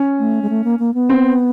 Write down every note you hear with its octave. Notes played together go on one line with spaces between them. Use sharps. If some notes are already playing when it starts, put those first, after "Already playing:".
Already playing: C#4
A3
G#3
A3
A#3
A#3
B3
C4